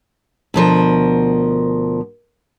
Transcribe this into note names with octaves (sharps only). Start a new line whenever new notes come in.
D2 B2 F3 A#4